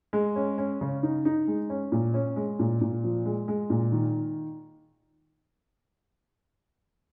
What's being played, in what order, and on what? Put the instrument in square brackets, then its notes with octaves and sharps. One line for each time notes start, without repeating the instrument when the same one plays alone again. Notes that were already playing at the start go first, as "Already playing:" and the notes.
[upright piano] G#3
C#4
C#4
C#3
D#4
D#4
G#3
C#4
A#2
C#4
G#3
A#2
A#2
F3
G#3
G#3
A#2
D#3